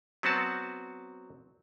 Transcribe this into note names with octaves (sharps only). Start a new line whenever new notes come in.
F#3 B3 C4 F#4 A5